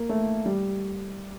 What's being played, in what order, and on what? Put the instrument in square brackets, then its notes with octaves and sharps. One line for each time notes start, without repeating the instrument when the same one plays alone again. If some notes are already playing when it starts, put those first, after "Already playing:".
Already playing: [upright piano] A#3
A3
G3